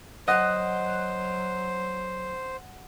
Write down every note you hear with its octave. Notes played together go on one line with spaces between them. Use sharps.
F#3 C5 D#5 F#5